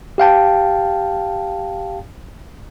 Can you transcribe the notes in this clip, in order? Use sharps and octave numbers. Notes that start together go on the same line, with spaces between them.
G4 F5 G5 A5